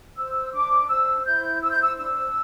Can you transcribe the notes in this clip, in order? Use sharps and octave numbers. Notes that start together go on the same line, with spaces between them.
C5 E6
D4 D6
C5 E6
E4 G6
C5 E6
G6
E6
D4 E6